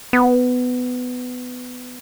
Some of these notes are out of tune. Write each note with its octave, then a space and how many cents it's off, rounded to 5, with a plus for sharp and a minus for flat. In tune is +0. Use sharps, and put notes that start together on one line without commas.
B3 +15